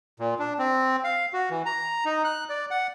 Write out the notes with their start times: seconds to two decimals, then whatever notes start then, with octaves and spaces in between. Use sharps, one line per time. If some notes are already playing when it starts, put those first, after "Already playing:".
0.20 A#2
0.39 D4
0.59 C4
1.04 F5
1.33 F#4
1.50 E3
1.66 A#5
2.05 D#4
2.25 F#6
2.49 D5
2.71 F#5